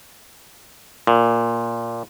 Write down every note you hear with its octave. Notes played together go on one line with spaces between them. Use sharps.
A#2